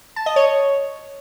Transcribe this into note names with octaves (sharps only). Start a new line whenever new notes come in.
A5
D#5
C#5